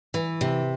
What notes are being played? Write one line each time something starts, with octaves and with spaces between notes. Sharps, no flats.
E3
C3